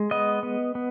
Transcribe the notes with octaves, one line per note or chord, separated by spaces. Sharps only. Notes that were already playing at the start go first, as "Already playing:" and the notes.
Already playing: G#3
B3 D#5
B3
B3